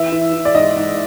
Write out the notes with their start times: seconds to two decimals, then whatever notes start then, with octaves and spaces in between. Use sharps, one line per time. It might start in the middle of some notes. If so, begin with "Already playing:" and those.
Already playing: E3 E5
0.12 E3
0.33 E3
0.45 D5
0.54 G#2 D#5
0.76 G#2